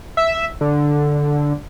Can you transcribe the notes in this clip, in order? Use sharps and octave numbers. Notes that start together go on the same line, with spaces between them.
E5
D3